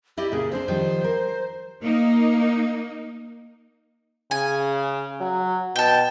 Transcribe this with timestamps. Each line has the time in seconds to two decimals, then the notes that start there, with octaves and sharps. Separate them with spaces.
0.18 E4 G4 D5 D#5
0.32 A#2 C#3 G#4
0.52 D3 C4 D4 C5
0.68 D#3 F3 G3
1.04 A#4
1.82 A#3 D#4
4.31 C#3 G#5
5.21 F#3
5.76 B2 G5 A5